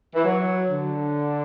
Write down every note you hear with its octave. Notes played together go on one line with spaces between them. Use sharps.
E3
F#3
D3